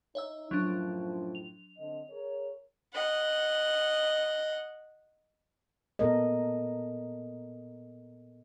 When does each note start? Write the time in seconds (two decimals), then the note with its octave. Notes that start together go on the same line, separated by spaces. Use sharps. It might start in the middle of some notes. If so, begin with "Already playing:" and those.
0.15 D#4 C#5 E5 E6
0.51 F#2 A2 F3 F#3 D4
1.35 F7
1.77 D3 C4 D#5
2.09 G#4 A#4 C#5
2.95 D#5 F#5
5.99 A#2 B3 A4 A#4 D#5